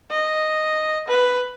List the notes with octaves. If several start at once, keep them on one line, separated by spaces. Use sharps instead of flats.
D#5
B4